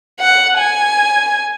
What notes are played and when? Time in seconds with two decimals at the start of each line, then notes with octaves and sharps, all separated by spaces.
0.20 F#5
0.58 G#5